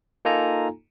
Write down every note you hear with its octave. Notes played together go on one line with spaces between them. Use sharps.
A#3 D#4 F4 A4 G#5 A#5